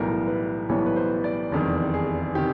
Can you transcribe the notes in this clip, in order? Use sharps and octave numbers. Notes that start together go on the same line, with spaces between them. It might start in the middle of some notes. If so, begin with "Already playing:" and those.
Already playing: B1 A2 E3 G3 B3 A#4
B4
B1 A2 E3 G3 B3 C#5
B4
C5
D5
F1 E2 C3 D#3 G3 D5
G#4
C3 D#3 G4